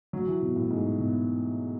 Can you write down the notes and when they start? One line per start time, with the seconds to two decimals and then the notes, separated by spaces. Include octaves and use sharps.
0.13 F#3
0.27 E3
0.42 B2
0.56 A2
0.71 G#2
1.00 B2